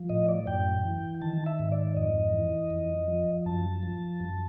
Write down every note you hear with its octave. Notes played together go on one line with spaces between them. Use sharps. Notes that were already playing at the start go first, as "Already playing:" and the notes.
Already playing: F3
A2 D#5
D5
F#2 G5
E3
D#3 A5
E5
G#2
D5
F2 D#5
E3
F2
F3
F#2 A5
F3
F#2